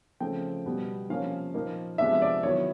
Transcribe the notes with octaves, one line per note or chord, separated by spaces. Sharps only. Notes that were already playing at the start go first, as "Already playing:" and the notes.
C#3 F3 A3 C4 G5
B2 G3 B3
C3 F3 A#3 C#4 F5
A#2 F3 A#3 D#4
C3 F3 G#3 B3 D4 E5
D5
D#3 F#3 B3 E4 C#5